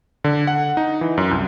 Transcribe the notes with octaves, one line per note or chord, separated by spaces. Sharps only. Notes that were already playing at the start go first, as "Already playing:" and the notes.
D3
F#5
D#4
E3
F#2
C2